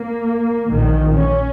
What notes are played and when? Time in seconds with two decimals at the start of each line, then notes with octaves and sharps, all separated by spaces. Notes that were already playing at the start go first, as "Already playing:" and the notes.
Already playing: A#3
0.69 A#1 A#2 D#3
1.17 C#4